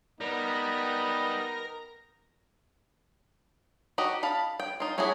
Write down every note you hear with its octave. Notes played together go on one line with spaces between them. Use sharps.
G3 B3 D#4 A#4
D#4 F#4 G4 D#5
F5 A5 B5
G5
D#4 F4
A3 C#4 E4 F#4 G#4